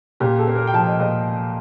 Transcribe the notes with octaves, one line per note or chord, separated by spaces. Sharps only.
A#2 G4
A4
A#3
A#4
G5
F3 A5
D#5
A#2 D#5